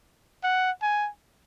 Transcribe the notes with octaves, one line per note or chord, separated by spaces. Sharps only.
F#5
G#5